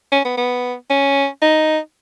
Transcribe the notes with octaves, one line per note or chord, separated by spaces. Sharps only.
C#4
B3
B3
C#4
D#4